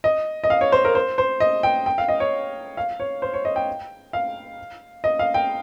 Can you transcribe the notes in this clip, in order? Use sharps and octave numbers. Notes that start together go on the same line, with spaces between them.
D#5
D#5
F5
C#5
C5
A#4
C5
C5
D#5
G5
G5
F5
D#5
C#5
F5
C#5
C5
C#5
D#5
G5
F5
D#5
F5
G5